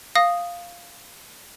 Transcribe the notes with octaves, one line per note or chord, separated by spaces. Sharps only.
F5 D#6 A#6